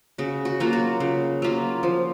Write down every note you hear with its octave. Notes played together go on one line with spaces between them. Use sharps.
C#3 F#4
F#4
F#3 A#3 F4
F#4
C#3
F#3 A#3 F4
F3